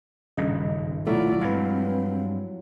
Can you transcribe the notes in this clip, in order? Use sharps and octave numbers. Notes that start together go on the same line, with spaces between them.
D#1 G#1 G2 C#3 D#5
B1 F3 F#3 A3 E4 F4 D5
G2 G#3 C4 B4 F5